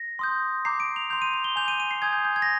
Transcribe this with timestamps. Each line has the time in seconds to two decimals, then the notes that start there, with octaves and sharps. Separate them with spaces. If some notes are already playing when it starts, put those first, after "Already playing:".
Already playing: A#6
0.19 C6 D#6 G6
0.65 A#5 D6 G6 C7
0.80 D7
0.96 F7
1.10 C6 G6 F7
1.22 D#7
1.34 F7
1.44 G7
1.56 G#5 D6 G6 F7
1.68 D#7
1.80 D#7
1.91 C7
2.02 G#5 D#6 G6 G#6
2.13 G6
2.25 G6
2.36 G#6
2.42 A#6